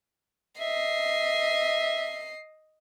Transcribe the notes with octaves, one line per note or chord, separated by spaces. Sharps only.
D#5 E5 C7